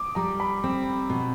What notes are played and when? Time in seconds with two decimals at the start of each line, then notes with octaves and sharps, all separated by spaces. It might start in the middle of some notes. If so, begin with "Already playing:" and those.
Already playing: D6 D#6
0.15 G3 A#5
0.40 B5
0.64 C4
1.10 B2